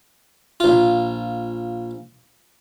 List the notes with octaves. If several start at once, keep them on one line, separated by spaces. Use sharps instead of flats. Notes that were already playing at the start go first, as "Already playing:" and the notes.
A#1 F4